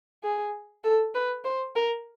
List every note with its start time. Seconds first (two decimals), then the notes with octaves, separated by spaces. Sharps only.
0.23 G#4
0.84 A4
1.15 B4
1.45 C5
1.75 A#4